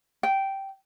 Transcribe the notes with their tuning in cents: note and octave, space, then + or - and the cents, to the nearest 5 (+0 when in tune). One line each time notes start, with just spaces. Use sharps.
G5 -10